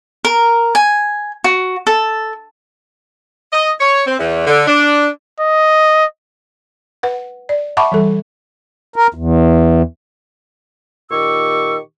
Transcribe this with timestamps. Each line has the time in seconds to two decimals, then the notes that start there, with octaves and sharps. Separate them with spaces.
0.25 A#4
0.75 G#5
1.44 F#4
1.87 A4
3.53 D#5
3.80 C#5
4.07 C4
4.19 E2
4.47 D3
4.68 D4
5.40 D#5
7.03 B4 F#5
7.49 D5
7.77 E5 F#5 A5 B5 C#6 D6
7.92 E3 G3 A4
8.96 A#4
9.14 E2
11.11 A#2 D#3 G4 C#6 D6 E6